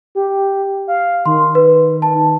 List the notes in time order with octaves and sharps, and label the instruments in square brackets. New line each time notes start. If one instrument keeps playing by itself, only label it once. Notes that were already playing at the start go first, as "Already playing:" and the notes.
[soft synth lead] G4
F5
[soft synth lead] D#3 [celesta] C6
[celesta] B4
A5